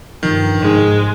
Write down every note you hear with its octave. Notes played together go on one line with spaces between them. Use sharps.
G2 C3 D#3 F3
G#2 G#3